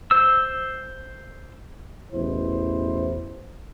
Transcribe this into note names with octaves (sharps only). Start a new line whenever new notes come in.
C5 E6
A1 E2 B2 E4 C5